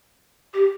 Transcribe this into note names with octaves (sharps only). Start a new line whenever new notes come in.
G4